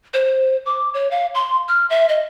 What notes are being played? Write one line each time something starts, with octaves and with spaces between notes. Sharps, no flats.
C5
D6
C#5
F5
C6
F6
E5
D#5